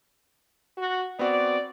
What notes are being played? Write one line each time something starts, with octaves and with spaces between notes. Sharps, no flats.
F#4
B3 C4 F#4 D5